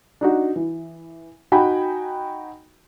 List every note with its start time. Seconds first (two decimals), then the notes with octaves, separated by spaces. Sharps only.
0.21 D4 D#4 F#4
0.56 E3
1.52 D#4 F#4 G5 G#5 B5